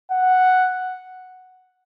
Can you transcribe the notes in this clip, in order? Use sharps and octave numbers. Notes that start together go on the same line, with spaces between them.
F#5